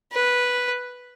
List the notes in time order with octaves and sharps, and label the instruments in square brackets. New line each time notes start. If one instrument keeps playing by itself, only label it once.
[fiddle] B4